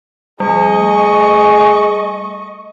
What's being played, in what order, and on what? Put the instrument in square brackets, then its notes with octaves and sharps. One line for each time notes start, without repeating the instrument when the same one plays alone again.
[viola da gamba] F2 [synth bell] G3 [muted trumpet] G#4 [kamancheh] D#5 C#6
[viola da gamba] A3